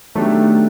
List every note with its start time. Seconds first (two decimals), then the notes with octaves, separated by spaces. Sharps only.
0.15 D#3 F#3 A3 B3 D4 G4